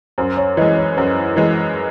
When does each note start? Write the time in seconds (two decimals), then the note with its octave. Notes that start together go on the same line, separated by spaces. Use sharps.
0.18 F#2 C5
0.37 C#5
0.57 E3 G#3 D#5
0.77 C#5
0.97 F#2 C5
1.36 E3 G#3